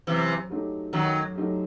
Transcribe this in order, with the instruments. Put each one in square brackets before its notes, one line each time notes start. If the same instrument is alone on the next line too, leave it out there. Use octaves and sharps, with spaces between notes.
[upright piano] F#2 [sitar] C3 E3
[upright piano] F#3 A3 D#4 G4
[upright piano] F#2 [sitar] D#3 F#3
[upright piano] F#3 A3 D#4 G4